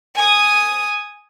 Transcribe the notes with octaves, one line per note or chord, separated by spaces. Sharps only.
G#5 D#6